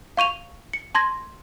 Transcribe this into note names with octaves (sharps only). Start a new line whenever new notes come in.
F5 C#6 D#7 F7
C#7
A5 C6 G#6 A#6